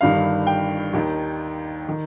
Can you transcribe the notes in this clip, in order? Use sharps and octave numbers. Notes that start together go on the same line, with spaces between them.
G1 G2 D#3 F5
G5
D#2 D#3
D#3